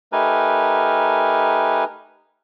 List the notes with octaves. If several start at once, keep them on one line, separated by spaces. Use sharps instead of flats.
A3 D#4 G4 A#4 B4 G#5